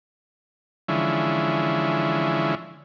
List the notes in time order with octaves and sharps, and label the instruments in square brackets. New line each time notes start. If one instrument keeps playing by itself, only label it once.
[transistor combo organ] D3 E3 F3 G#3 C#4 E4